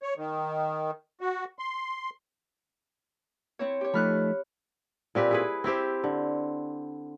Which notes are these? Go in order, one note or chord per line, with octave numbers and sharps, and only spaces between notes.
C#5
D#3
F#4
C6
C4 E4 C#5
G4 C#5
F3 A3 D#4 B5 F6 F#6
A#2 C4 G4 B4
E4 G#4 B4
C4 E4 G4 C5
D3